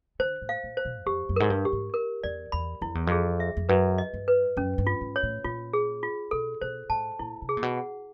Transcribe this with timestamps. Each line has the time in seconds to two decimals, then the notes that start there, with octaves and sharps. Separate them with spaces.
0.19 D3 C5
0.42 A2
0.49 F5
0.64 A#2
0.77 C5
0.85 B2
1.01 E2
1.06 F2 G4
1.29 F#2
1.36 G#2 A#4
1.50 G2
1.65 G4
1.73 G#2
1.94 A#4
2.24 E2 D5
2.52 E2 B5
2.82 F2 E4
2.95 E2
3.07 F2 G#4
3.40 E5
3.57 F2
3.69 F#2 B4
3.98 D#5
4.14 G2
4.28 B4
4.57 F#2 C#4
4.78 G2
4.87 F4
5.01 G#2
5.16 C#5
5.23 A2
5.44 A#2 F4
5.73 G#4
6.03 F4
6.31 B2 A4
6.61 B2 C5
6.90 A2 A5
7.19 A#2 E4
7.42 C3
7.49 G#4
7.57 A#2
7.63 B2
7.77 F#5